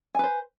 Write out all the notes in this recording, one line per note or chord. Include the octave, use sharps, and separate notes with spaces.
B4 C5 G#5